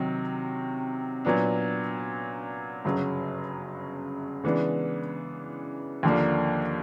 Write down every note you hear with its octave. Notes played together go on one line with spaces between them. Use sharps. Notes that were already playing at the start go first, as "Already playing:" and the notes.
Already playing: C3 D#3 F#3
A#2 F#3 B3 D4
G1 F#2 C#3 F#3
C#3 E3 G#3 B3 D4
D#2 D3 F3 A#3 D4